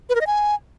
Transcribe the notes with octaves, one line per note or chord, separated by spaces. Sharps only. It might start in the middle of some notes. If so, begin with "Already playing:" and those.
B4
A#4
D#5
G#5